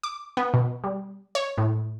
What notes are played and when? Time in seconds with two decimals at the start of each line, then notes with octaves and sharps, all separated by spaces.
0.03 D6
0.37 B3
0.54 B2
0.84 G3
1.35 C#5
1.58 A2